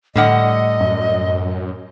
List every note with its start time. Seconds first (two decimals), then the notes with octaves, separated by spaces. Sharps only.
0.16 A2 D3 G3 D#5 F#5
0.80 F#2